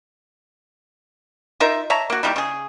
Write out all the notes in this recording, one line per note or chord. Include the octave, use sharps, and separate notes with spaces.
D#4 F4 A#4 E5
C#5 E5 A5 A#5
A#3 F#4
D#3 G3 A#3 E4
C#3 G#4